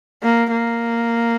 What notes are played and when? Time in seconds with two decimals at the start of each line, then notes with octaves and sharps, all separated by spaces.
0.23 A#3
0.51 A#3